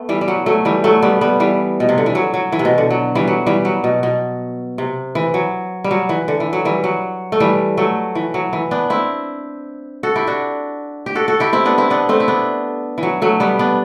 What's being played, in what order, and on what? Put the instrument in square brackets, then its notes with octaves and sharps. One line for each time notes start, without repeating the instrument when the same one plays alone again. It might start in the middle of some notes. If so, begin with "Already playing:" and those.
Already playing: [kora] A3 B3
E3 G3
G3
F#3
F#3 A3
E3 G3
F#3 A3
G3 B3
G3 B3
E3 G3
B2
C3
D3
E3
F#3
F#3
E3
C3
B2
D3
F#3
E3 G3
F#3
E3 G3
F#3
B2
B2
C3
E3
F#3
G3
F#3
E3
D3
E3
F#3
E3 G3
F#3
A3
E3 G3
F#3 A3
E3
F#3
E3
B3 D4
C4 E4
F#4 A4
E4 G4
D4 F#4
G4
F#4 A4
F#4 A4
E4 G4
C4 E4
B3 D4
C4 E4
B3 D4
A3 C4
E4
B3 D4
E3
F#3
F#3 A3
G3 B3
B3 D4